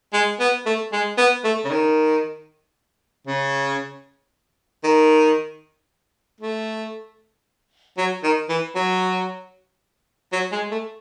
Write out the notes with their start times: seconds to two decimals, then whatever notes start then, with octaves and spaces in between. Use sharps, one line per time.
0.14 G#3
0.40 B3
0.66 A3
0.93 G#3
1.18 B3
1.44 A3
1.65 C#3
1.71 D#3
3.27 C#3
4.84 D#3
6.40 A3
7.97 F#3
8.23 D#3
8.49 E3
8.75 F#3
10.33 F#3
10.52 G#3
10.71 A3